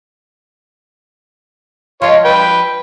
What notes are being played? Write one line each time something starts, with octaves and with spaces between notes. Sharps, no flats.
F3 F4 C#5 D#5
B4 G5